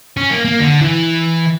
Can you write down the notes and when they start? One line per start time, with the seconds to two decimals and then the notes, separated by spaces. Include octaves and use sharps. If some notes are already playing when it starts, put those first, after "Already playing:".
0.17 C#4
0.31 A#3
0.45 A#3
0.60 D3
0.81 E3